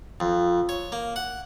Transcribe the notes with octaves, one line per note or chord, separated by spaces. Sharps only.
F2
C#5
A#3
F#5